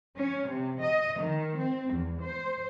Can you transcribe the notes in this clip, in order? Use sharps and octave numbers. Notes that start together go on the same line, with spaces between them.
C#4
C3
D#5
D#3
C4
E2
C5